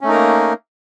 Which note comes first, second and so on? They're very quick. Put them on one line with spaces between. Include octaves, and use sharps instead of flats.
C#4 A3 D#4 A#4 A#3